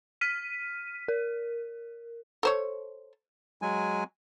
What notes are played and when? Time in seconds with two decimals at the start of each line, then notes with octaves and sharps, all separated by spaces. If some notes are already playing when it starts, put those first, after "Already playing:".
0.21 F6 B6 D#7
1.08 A#4
2.43 A4 C5 C#5
3.62 F#3 G#3 G#5